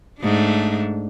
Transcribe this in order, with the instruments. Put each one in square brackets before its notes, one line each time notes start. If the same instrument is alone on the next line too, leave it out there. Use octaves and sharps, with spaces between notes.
[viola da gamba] G#2 A3 D4